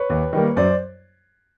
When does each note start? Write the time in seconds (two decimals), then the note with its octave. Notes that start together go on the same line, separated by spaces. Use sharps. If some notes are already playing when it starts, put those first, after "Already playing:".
Already playing: B4 C#5
0.10 D#2
0.33 D#3 G3 A#3
0.57 F#2 C5 D5